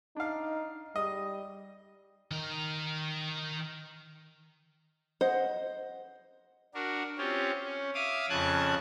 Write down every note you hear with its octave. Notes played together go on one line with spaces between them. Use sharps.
D4 D#4 F5
G3 D#5
D#3 A#4
C5 D#5 F#5
D4 F#4 A#4
C4 C#4 F4 G4
C#4
E5 F5 D6 D#6
F2 C#3 A5 F#6 G#6